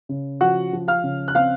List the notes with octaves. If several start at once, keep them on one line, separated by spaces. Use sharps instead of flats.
C#3
F3 F#4 F#5
F3
F5 F6
C#3
F#6
C4 F5 F6